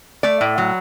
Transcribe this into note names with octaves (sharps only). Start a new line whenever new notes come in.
A3 D5
A2
F#3